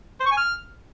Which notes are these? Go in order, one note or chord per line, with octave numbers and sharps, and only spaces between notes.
C5
C#6
G#5
F6